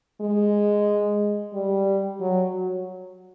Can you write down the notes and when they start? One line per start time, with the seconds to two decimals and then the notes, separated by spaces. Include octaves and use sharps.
0.21 G#3
1.53 G3
2.20 F#3